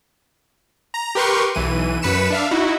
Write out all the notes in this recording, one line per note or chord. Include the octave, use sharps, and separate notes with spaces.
A#5
G4 A#4 B4 C6 C#6
B1 E3 D#7
F#2 B4 B6 C#7 E7
D4 E5 F5
D#4 E4 F#4